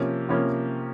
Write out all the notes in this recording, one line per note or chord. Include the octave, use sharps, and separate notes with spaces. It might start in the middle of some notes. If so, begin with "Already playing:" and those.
Already playing: C3 F3 A#3 C#4
C3 F3 A#3 C#4